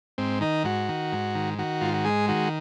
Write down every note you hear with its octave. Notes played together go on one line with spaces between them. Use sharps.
G#2 C4
D#3 D#4
G#2 F#4
D#3
G#2
D#3
D#3 F#4
G#2 F4
F#4
G#3 G#4
D#3 F#4